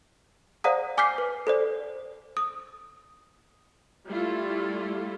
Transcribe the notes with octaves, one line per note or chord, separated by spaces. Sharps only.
C5 D5 F5 F#5 A#5 D#6
G#5 D6 F6 G6 B6 C7
B4
A4 C5 D5
D#6
G3 A3 E4 F4 A4